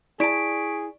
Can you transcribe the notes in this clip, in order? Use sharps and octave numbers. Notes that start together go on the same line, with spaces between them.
E4 G#4 D5 A5 C#6 B6 D7